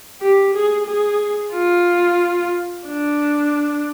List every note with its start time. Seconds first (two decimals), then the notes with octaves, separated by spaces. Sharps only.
0.20 G4
0.54 G#4
0.86 G#4
1.53 F4
2.87 D4